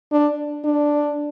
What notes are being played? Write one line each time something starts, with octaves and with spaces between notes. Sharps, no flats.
D4
D4